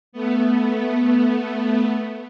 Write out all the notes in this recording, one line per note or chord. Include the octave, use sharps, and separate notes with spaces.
A3 B3